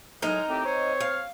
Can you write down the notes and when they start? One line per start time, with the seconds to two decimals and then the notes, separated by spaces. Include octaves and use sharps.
0.22 A2 F#3 G#3 D#4 A#4
0.49 A2 C4 G4
0.66 C4 C5 C#5
1.00 F5